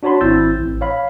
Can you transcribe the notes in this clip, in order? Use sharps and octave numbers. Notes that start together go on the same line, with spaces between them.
D4 F#4 C#5 A5 B5 C6
G#1 C4 E4 E6 G6 A6
A1
C#5 F5 B5